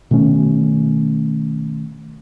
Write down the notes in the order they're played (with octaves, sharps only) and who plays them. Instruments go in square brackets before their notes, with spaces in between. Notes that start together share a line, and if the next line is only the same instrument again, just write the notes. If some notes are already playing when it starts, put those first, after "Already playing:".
[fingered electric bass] B2 D#3 A3 C#4